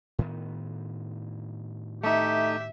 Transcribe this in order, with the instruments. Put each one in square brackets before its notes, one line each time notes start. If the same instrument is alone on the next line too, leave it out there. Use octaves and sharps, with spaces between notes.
[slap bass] A2 D#3 B3
[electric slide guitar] A3 D#4 [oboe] G4 [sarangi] E5